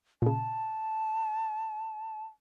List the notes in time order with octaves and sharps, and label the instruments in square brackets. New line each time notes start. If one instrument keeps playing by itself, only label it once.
[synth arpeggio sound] A#2 C#3 [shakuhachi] A5